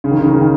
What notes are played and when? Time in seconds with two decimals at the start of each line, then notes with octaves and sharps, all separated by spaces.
0.04 C#3
0.11 D#3
0.19 C#3
0.26 D#3
0.34 C#3
0.42 D#3